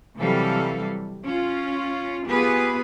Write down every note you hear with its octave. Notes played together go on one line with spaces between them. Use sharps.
C3 E3 F#3 G3 A4 F5
C#4 F4
B3 F4 G4 G#4 B4